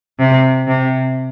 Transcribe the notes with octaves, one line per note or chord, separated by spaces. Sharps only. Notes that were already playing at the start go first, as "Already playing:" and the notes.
C3
C3